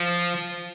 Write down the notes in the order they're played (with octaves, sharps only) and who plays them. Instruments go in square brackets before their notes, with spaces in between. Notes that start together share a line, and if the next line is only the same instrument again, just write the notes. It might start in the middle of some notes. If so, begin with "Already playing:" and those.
Already playing: [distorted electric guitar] F3